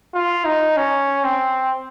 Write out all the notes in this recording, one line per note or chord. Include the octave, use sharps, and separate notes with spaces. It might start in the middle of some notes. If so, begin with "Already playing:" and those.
F4
D#4
C#4
C4